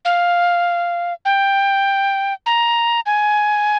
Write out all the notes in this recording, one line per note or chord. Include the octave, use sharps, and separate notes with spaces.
F5
G5
A#5
G#5